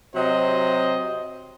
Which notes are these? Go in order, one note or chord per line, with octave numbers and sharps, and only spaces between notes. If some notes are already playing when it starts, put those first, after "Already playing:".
C3 F#3 C5 D#5